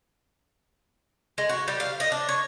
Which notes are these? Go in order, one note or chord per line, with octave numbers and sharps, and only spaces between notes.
G#3
F#4
G3
F5
D#5
D4
C#5